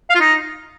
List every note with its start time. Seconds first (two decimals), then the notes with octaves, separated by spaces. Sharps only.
0.10 F5
0.15 F4
0.20 D#4